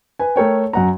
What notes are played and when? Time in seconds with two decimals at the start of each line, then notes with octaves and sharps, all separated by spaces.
0.19 B4 G#5
0.36 A3 A4 A#4 C#5 G5
0.73 F#2 F#5 A#5